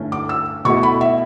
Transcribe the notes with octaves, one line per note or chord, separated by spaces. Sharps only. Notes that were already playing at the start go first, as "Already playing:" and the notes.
Already playing: G2 D3 A3 C#4 E4
D6
E6
B2 A3 E4 C#6
B5
E5